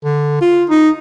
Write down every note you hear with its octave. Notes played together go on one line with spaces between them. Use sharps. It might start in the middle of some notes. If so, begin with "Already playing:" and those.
D3
F4
D#4